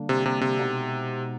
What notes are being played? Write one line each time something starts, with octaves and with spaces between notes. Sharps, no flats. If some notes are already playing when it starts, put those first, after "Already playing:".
Already playing: D3 G3 A#3 D4
C3
C3
C3
B2 G#3 B3 D#4